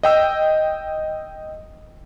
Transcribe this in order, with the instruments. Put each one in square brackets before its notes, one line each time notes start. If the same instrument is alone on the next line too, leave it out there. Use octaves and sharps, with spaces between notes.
[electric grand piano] D#5 G5 E6